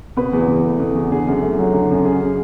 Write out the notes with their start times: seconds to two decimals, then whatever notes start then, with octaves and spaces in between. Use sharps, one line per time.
0.17 B2 B4
0.33 E2
0.48 E2
0.65 A3
0.80 B2
0.95 E2
1.11 D3 G#4
1.27 F#2
1.43 A3
1.59 F#3
1.73 D3
1.90 F#2
2.05 C#3 G#4